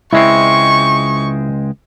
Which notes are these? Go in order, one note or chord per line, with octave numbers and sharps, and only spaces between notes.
C#2 G#3 C4 E4 C#6